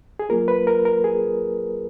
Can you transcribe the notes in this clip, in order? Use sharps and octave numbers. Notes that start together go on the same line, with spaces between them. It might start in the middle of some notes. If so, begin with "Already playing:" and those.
G#4
F#3 A#3 F4 A#4
B4
A#4
A#4
G#4